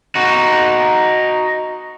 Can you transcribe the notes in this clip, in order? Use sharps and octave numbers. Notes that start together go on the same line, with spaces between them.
D#4 F#4